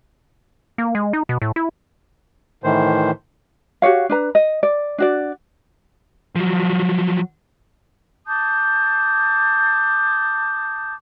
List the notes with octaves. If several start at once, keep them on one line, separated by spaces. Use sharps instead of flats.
A#3
G#3
D#4
B2
A2
E4
A2 D#3 E3 C5
F#4 G4 C#5 F5
D4 B4 A#5
D#5
D5
D4 F#4 D5
F3 F#3
A5 D6 D#6 G6